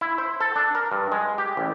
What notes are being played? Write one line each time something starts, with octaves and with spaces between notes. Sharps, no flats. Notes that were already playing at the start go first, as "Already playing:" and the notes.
E4
C5
A4
D4
A#4
G2
G#3
G4
A1